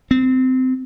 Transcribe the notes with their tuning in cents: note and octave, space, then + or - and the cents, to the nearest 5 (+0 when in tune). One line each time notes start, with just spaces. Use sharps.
C4 -20